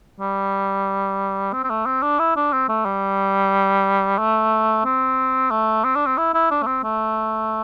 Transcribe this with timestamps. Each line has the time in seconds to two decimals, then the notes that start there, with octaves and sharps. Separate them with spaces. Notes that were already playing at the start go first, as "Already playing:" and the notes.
0.20 G3
1.53 C4
1.64 C4
1.70 A3
1.86 C4
2.02 D4
2.20 E4
2.36 D4
2.53 C4
2.69 A3
2.85 G3
4.19 A3
4.85 C4
5.51 A3
5.84 C4
5.96 D4
6.06 C4
6.17 E4
6.34 E4
6.51 D4
6.63 A3
6.66 C4
6.84 A3